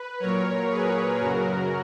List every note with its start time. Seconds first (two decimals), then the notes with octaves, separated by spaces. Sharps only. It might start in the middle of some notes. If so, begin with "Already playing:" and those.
Already playing: B4
0.20 A#2 F#3 A#4 C#5
0.70 G#4 B4
1.20 F#2 C#3 F#3 F#4 A#4